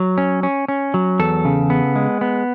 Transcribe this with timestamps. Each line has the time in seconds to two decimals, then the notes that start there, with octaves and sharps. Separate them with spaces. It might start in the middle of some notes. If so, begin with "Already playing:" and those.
Already playing: F#3
0.18 C#4
0.43 C#4
0.68 C#4
0.94 F#3
1.19 E2 A4
1.45 C#3
1.70 B3
1.96 G#3
2.21 B3